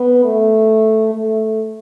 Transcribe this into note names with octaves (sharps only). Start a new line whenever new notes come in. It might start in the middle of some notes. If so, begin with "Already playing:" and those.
Already playing: B3
A3
A3